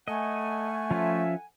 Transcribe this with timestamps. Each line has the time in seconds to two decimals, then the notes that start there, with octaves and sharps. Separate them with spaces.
0.08 A3 A4 D#5 F#5 G#5
0.91 F3 C#4 F4 E5